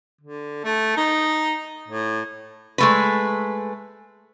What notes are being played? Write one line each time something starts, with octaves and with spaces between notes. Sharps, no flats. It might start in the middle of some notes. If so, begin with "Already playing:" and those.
D3
A3
D#4
A2
G#3 A3 B4